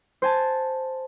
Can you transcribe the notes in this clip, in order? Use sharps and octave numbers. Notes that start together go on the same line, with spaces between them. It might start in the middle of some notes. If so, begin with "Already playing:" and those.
C5 G#5 A5